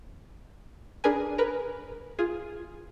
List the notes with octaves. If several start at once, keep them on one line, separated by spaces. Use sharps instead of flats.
D4 G#4 A#4 B4 G#5
A#4 B4
F4 G#4